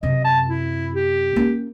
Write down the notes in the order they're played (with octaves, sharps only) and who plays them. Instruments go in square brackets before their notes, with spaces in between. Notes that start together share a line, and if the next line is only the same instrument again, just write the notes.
[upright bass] F#2 C3 [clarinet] D#5
[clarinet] A5
E4
G4
[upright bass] A#3 C#4